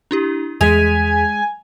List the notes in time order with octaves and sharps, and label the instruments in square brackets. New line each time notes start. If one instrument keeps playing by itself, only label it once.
[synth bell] D4 E4 G4
[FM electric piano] E2 G#4 B6 [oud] G#3 [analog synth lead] G#5 [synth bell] F7